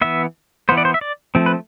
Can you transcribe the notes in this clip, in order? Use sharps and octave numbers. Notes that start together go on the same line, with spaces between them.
E3 B3 E5
E3 B3 C5
D5
C5
E5
D5
F3 A3 C4
B4